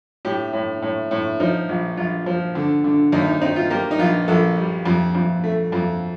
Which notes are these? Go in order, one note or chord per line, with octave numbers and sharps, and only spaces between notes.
A2 G4
A2
A2
A2
F3 D#4
A#1
A#1 F4
F3
D3
D3
D#2 D#4
D#4
C4 D#4
F4
A#3 G4
D#4
A#1 F4
A#1 A4
G3
F2
F2
A3
F2